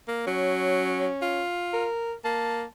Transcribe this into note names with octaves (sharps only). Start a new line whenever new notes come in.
A#3
F#3 C#4
F4
A#4
A#3 A5